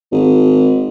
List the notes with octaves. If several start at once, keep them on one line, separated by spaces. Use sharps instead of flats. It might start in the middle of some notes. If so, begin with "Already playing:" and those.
G#1